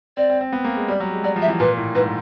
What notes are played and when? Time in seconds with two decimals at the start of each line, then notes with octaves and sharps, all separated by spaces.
0.17 C4 D5
0.30 C4
0.41 C4
0.53 B3
0.65 A#3
0.77 G#3
0.88 G3 D5
1.00 F#3
1.12 G#3
1.24 F#3 D5
1.36 F3
1.42 E5
1.48 E3
1.59 A#2 B4
1.77 A2
1.95 G#2 B4